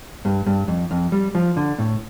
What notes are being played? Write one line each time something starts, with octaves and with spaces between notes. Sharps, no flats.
G2
G2
F2
F2
G3
F3
D3
A2